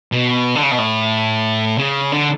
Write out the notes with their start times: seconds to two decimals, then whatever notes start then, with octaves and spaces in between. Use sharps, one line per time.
0.12 B2
0.55 D3
0.63 C#3
0.71 B2
0.79 A2
1.78 C#3
2.12 D3